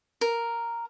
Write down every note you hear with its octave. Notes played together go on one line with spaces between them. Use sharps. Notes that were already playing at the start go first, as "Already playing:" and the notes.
A#4